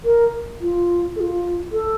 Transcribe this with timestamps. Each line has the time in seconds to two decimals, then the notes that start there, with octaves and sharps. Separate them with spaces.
0.05 A#4
0.61 F4
1.16 A4
1.20 F4
1.72 A4